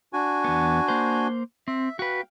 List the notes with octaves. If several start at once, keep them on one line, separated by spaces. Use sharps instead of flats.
D4 F#4 G#5
E2 B3
A#3 C5
C4 E5
F#4 B4 F5 G5